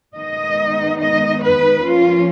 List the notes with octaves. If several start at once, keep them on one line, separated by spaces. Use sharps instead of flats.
D#3 G#3 B3 D#4 D#5
D#5
B4
F3 A#3 C#4 F4